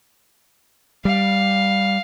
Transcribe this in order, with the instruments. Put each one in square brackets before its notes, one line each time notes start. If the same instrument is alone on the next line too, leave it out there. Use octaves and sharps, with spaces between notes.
[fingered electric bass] G3 [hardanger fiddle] F5